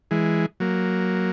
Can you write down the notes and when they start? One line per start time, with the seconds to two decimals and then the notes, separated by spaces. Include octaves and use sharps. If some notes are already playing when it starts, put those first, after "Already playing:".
0.11 E3 G#3
0.60 F#3 A#3